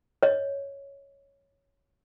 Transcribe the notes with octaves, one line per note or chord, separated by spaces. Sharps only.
C#5 D#5